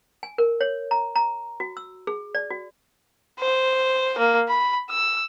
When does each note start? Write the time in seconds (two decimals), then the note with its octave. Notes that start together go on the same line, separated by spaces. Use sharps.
0.23 G#5
0.38 A#4
0.61 C#5
0.91 A#5
1.16 A#5
1.60 F#4
1.77 E6
2.07 G#4
2.35 D5
2.50 F#4
3.40 C5
4.18 A#3
4.48 B5
4.90 E6